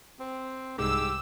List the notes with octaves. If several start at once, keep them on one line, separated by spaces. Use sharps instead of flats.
C4
C2 G#2 G#3 G4 E6